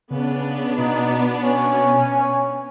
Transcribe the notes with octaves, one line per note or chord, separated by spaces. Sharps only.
C#3 B3 D4
B2 D#4
C#4 C#5